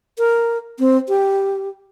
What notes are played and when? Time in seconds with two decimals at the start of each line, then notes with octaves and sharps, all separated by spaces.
0.18 A#4
0.79 C4
1.08 G4